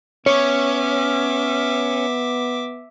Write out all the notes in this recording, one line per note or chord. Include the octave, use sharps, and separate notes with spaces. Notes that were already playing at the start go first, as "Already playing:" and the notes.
B3 C#4 C#5 E5 D6